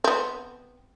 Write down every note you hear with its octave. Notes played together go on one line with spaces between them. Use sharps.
B3 C4